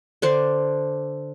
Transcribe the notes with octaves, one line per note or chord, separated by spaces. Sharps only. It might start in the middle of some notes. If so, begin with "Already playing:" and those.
D3 D4 C5